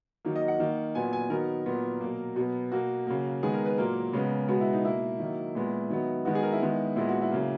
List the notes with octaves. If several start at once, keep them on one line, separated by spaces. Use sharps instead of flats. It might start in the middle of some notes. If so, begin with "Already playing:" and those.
D#3 F#3 A#3
D#5
F#5
D#3 A#3
A#2 F#3 B3 G#5
G#5
D#3 F#3 B3 A#4
A#2 F#3 B3
B2 F#3 A#3
B2 F#3 B3
B2 A#3 F#4
C#3 F#3 A#3
D#3 G#3 B3 G#4
A#4
B4
A#2 F#3 A#3 A#4
C#3 G#3 B3
B2 G#3 B3 F#4
E4
D#4
B2 A#3 E4
D#3 F#3 A#3
A#2 G#3 B3
D#3 F#3 B3
D#3 G#3 B3 F#4
G#4
A#4
E4
D#3 G#3 B3
A#2 G#3 B3 E4
F#4
E4
C#3 F#3 A#3